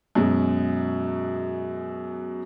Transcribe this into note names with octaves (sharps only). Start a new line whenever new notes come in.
F#2 B2 F#3 G#3